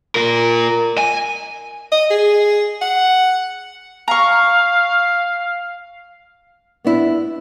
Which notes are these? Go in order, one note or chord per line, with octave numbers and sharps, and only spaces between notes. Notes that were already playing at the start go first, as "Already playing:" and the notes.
F4 A#4
G#5
D#5
G#4
F#5
F5 A#5 C#6
B3 D4 E4